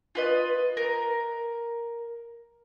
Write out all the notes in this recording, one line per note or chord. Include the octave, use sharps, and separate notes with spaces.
F4 B4 D#5
A#4